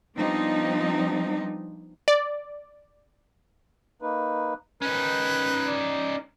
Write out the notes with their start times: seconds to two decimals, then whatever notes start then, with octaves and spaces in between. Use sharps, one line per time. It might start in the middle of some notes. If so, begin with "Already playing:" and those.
0.15 F3 G3 B3 C4 D4 D#4
2.08 D5
4.02 A#3 D#4 B4
4.82 D#3 C#4 D#4 B4
5.67 D5